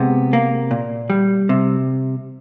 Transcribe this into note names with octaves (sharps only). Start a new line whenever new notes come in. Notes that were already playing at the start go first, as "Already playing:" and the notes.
Already playing: C3 G#3 B3
A#3
A#2
G3
C3